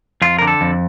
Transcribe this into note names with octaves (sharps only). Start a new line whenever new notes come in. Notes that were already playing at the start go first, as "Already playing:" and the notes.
F2 F4
D3 A#4
A4
F2